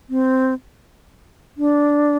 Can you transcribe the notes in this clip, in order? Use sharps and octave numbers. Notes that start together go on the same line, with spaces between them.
C4
D4